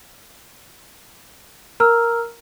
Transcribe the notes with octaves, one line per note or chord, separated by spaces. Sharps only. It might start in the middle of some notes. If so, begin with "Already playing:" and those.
A#4 A#5 E6 F6